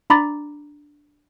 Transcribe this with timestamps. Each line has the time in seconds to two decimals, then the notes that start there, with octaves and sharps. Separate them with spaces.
0.10 D4 A#5 B5 D6 A6